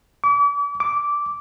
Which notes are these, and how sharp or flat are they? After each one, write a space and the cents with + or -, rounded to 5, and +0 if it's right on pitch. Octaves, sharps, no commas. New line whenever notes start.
D6 -40
D6 -10